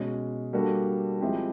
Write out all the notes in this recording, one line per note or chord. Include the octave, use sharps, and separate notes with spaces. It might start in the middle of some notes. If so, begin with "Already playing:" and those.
Already playing: B2 G#3 C#4
G3 A#3 D4 F#4 A4
F3 G#3 C4 E4 G4